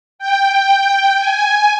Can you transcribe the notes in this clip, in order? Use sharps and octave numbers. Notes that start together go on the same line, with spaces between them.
G5
G#5